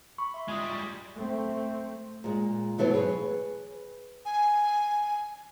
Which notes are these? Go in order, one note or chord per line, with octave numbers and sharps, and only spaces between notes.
B5 C#6
E5 C6
G3 G#3 F4 D#6
A3 C4
A#2 G#3
B2 E3 F#3 A3 B3
G#4 B4 C#5
G#5